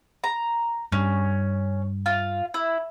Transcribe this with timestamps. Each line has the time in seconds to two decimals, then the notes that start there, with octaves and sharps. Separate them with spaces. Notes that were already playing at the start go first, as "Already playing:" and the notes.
0.24 A#5
0.92 G2 C#4
2.06 F4
2.54 E4